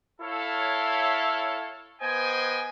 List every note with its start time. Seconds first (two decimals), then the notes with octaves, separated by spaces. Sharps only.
0.21 E4 A4 C#5 F5
2.02 B3 C5 D#5 G5 G#5